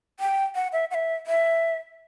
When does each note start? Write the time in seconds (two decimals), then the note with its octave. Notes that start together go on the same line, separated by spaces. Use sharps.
0.20 G5
0.55 F#5
0.73 E5
0.91 F#5
0.94 E5
1.27 E5